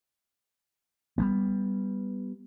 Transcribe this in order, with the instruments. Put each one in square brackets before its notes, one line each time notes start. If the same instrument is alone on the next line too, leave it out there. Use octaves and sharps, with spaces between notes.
[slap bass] G3 A3 B3